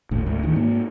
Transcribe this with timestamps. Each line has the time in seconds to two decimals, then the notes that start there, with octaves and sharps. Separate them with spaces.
0.11 G1 D2 A2
0.26 D2 G#2
0.43 D1 D2 D#3 E3
0.55 G#2 A#3